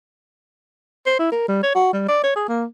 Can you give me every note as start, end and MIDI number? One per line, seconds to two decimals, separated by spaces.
1.06 1.18 72
1.19 1.31 64
1.32 1.44 70
1.48 1.58 55
1.63 1.72 73
1.75 1.88 66
1.93 2.04 55
2.08 2.20 74
2.24 2.33 73
2.36 2.45 68
2.48 2.65 58